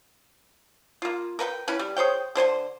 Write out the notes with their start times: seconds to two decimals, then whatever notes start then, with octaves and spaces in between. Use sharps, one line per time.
1.02 A#3 F4
1.39 A#4 B4 F#5 G5
1.68 E3 C#4 E4 B4
1.79 G3
1.96 G#4 C5 C#5 G5
2.35 D3 C5 G#5 C6